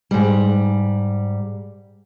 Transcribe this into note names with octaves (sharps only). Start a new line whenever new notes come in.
G#2 G3